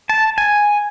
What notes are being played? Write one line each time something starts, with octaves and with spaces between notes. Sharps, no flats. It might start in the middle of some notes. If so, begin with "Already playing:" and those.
A5
G#5